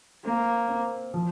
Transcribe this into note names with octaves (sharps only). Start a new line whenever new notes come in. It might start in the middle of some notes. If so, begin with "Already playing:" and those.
A#3 C4
C4
F3